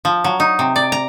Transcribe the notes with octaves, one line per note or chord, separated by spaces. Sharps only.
F3
F#3
D#4
C3
D5
A#5